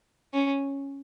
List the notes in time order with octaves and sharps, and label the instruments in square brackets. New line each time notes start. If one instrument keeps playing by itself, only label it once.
[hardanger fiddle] C#4